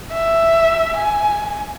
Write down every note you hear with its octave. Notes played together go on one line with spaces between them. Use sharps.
E5
G#5